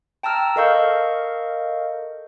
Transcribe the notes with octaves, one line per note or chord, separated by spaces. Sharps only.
G5 A5 A#5 E6 F6
A4 A#4 D#5 F5 C#6 G6